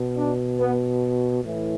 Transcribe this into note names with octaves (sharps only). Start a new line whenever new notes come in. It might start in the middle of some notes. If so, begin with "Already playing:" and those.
Already playing: B2
D4
B3
A2 E3